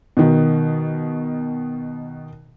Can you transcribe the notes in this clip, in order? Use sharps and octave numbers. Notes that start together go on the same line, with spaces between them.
B2 D#3